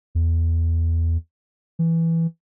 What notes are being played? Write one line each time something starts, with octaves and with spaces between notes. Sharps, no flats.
E2
E3